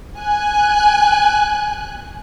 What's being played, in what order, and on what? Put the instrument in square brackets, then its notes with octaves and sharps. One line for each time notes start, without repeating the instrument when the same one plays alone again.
[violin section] G#5 F#6